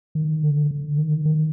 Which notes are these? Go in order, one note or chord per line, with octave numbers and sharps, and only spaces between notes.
D#3
D3
D3
D#3
D#3